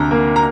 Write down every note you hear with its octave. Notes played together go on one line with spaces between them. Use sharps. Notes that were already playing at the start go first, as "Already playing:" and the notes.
Already playing: D2 C3 D4 A#5
A#3
A#5